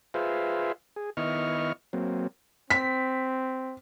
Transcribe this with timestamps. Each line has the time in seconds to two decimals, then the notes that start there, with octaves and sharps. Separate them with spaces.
0.14 F4 G#4 B4 C5 E5 F5
0.96 G#4
1.17 D#3 B3 E4 D#5 C#6 F6
1.93 F#3 A#3 C4
2.70 C4 B6